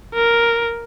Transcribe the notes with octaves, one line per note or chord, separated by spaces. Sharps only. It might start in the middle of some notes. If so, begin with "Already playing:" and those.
A#4